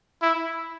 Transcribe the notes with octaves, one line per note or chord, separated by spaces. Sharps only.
E4